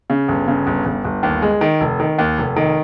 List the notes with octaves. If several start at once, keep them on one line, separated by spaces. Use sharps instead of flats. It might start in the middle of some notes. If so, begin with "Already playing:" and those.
C#3
G1
C#3
G1
G1
G1
D#2
G#3
D#3
F1
D#3
D#2
F1
D#3